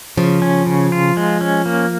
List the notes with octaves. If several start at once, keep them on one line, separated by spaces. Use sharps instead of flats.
C#3 F3
C#4
C#3
F4
G#3
C#4
A#3